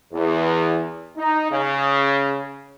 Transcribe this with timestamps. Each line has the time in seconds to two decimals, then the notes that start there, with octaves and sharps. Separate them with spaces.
0.13 E2
1.17 D#4
1.50 C#3